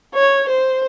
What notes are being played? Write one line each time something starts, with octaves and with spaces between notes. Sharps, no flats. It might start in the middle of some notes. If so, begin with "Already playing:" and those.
C#5
C5